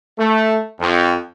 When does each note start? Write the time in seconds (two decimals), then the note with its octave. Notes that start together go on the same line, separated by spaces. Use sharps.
0.18 A3
0.79 F2